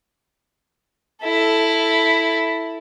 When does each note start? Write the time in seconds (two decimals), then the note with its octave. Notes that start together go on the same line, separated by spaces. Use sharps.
1.24 E4 A4